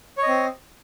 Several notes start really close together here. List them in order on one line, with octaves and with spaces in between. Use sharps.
C#5 D#5 C4